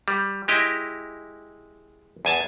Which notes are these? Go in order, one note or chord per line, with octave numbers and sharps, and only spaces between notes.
G3
G#3 E4 G4 D#5
E2 G#5 A5